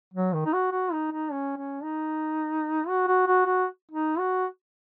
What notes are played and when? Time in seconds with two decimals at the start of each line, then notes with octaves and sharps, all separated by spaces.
0.14 F#3
0.34 D#3
0.45 D#4
0.53 F#4
0.72 F#4
0.92 D#4
1.11 D#4
1.32 C#4
1.57 C#4
1.83 D#4
2.87 F#4
3.07 F#4
3.27 F#4
3.46 F#4
3.92 D#4
4.18 F#4